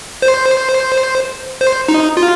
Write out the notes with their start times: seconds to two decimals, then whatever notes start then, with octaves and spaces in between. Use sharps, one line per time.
0.22 C5
1.61 C5
1.88 D#4
2.17 F4